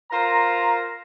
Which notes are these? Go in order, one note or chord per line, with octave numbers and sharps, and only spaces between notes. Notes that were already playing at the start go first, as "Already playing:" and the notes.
F4 A#4 C5 A#5